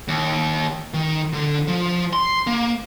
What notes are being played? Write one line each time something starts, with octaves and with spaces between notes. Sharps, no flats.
D#2
D#3
D3
F3
C6
A#3